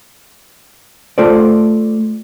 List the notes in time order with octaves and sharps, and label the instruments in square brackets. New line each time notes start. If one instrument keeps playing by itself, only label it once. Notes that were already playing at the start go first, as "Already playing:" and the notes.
[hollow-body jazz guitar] A3 F4 A4 C5 D5